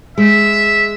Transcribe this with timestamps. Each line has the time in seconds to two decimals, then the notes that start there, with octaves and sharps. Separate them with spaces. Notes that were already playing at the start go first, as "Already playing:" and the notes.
0.18 G#3 E5